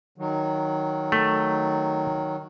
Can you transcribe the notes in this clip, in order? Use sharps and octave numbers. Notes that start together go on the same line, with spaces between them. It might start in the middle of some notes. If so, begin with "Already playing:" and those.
D#3 F#3
A3